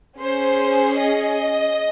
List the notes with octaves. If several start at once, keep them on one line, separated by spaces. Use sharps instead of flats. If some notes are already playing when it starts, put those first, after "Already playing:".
C#4 G#4 C5
D#5